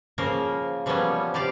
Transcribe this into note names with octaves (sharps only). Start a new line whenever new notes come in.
C#3 F3 A#3 A#4
E3 F3 G3 A#3 B3 C#4
C3 G4 D5 F5